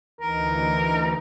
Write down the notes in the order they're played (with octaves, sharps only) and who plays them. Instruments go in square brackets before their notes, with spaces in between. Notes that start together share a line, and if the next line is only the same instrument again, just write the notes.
[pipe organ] D2 E3 D#4 [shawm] A#4